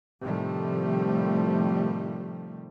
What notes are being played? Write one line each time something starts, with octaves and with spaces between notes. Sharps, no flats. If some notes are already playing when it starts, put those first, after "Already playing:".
A2 C3 D#3 F3 G3 A3